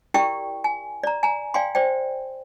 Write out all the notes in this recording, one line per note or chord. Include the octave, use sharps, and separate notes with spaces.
E4 G4 A#4 D5 G5 C#6
G#5
D5 A#5
G#5 A#5
D5 F5 G5 G#5 C6
C5 D5 G5